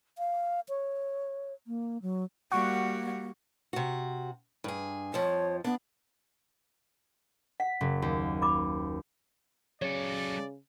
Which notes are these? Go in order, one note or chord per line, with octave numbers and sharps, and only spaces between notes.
F5
C#5
A#3
F#3
G3 A#3 F#4 F#5 C#6
C3 F#4
G2 G#4
F2 F3 C#5
B3 D4
F#5 B6
F#1
D#2
B5 D6
C#3 F#3 A4 C#5 D5